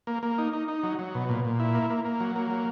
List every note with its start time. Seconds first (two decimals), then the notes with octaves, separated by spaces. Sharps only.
0.07 A#3
0.23 A#3
0.38 D#4
0.53 D#4
0.68 D#4
0.84 F#3
0.99 F#3
1.15 B2
1.29 A#2
1.45 A#2
1.60 E4
1.75 A#3
1.90 A#3
2.05 A#3
2.20 F#3
2.36 A#3
2.51 F#3